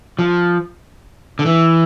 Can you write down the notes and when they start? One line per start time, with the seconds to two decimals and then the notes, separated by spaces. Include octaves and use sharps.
0.19 F3
1.39 D3
1.46 E3